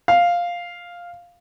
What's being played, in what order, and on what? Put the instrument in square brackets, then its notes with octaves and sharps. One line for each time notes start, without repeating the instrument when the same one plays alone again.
[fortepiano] F5